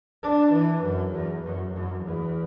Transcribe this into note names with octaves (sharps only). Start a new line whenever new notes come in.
D4
E3
F#2
E2
F#2
F#2
E2